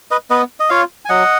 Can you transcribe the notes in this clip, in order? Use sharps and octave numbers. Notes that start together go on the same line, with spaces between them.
B4 D#5
B3 B4 D#5
D#5
F4 C#5 F5
G#5
F#3 D#5 F#5